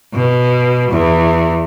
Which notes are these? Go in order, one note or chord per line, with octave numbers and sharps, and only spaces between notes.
B2
E2